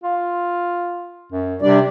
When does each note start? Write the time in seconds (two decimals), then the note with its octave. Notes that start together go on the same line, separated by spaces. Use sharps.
0.03 F4
1.32 F#2
1.62 C3 G3 D4 D5